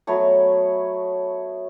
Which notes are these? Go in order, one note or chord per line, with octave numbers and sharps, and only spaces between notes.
F#3 A3 B3 C#5